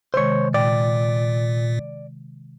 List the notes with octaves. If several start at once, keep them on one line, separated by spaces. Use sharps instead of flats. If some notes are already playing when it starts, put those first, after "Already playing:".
C3 D#3 G#3 C5 C#5
A#2 D5 G5